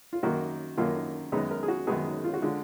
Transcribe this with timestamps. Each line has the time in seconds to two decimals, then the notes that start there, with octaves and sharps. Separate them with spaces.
0.13 F4
0.23 F#2 D#3 A#3 F#4
0.77 F#2 D#3 A#3 F4
1.32 F#2 D#3 G#3 B3 D#4
1.51 A#4
1.63 G#4
1.68 F#4
1.87 F#2 D#3 G#3 B3 G#4
2.24 F4
2.33 F#4
2.42 D3 G#3 F4